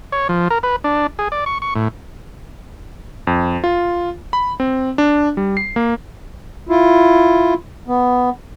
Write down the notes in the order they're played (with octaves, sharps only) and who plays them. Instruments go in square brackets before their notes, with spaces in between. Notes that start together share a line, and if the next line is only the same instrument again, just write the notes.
[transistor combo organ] C#5
F3
A#4
B4
D4
G#4
D5
C#6
C#6
A2
[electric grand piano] F2
F4
B5
C4
D4
G3
C7
A#3
[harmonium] E4 F4
B3